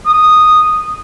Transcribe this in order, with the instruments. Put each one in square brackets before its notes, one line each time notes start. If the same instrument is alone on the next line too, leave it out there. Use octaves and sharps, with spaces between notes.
[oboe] D#6